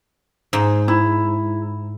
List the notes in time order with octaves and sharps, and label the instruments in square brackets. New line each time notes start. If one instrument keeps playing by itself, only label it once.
[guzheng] G#2
[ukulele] E4